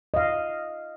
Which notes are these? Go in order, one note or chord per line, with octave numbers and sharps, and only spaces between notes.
D#5 F5